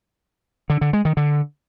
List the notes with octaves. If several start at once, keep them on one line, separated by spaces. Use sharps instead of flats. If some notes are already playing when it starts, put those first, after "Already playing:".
D3
D3
G#3
D#3
D3